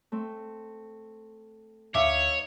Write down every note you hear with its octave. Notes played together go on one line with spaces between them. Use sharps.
A3 C4
D2 D#4 C#5 E5 F5 D6 D#6